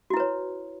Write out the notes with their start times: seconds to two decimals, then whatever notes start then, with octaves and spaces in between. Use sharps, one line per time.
0.10 F#4
0.14 E4
0.17 B4
0.20 C#5